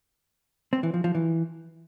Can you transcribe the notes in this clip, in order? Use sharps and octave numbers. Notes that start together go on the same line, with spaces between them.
C4
E3
F3
F3
E3